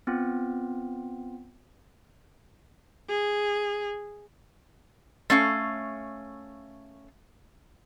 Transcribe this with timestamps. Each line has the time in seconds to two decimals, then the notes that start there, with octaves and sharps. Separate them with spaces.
0.07 B3 C4 F4
3.09 G#4
5.30 A3 C#4 F5